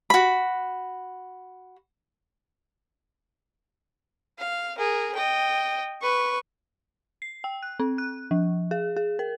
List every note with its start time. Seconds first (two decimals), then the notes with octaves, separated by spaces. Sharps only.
0.10 F#4 B5
4.39 F5
4.78 G#4 A#4
5.15 D#5 G5
6.02 B4 C#6
7.22 C7
7.44 G5
7.63 F#6
7.80 C4
7.98 F#6
8.31 F3
8.71 G#4
8.96 G#4
9.19 A#4